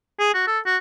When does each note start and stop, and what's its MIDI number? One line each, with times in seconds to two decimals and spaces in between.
0.20 0.33 68
0.34 0.45 66
0.47 0.59 69
0.66 0.77 66